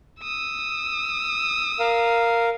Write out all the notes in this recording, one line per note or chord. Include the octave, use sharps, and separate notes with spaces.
D#6 E6
A#4 F5